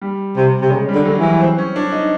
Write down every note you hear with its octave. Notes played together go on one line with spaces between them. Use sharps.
G3
C3
C3
C#3 G#3
G3
D3
F#3
E3
F#3
C4
C#4
D4
D#4